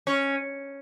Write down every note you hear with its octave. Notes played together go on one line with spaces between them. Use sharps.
C#4